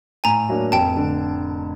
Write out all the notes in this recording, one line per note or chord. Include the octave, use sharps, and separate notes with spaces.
A2 G#5 A#5
F#3 A#3 D4
F1 G5 A5
D3